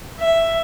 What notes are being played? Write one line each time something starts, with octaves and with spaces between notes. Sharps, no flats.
E5